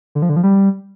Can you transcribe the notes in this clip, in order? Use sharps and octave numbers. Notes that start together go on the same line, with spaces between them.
D3
F3
D3
F3
G3